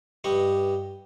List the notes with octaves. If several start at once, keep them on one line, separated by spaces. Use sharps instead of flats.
G2 G4 B4 D#5 B5 C#6